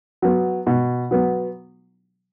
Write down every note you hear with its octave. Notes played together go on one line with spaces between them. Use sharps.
F#3 B3
B2
F#3 B3